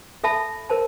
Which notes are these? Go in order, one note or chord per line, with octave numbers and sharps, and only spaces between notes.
A4 E5 A5 B5
A#4 C5 A5